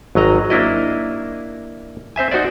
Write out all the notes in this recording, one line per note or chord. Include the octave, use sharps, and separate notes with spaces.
G#1 F#3 D#5 A#5
A#3 D4 E4 D#5
C4 C5 E5 G#5
D#4 F#4 C5 D5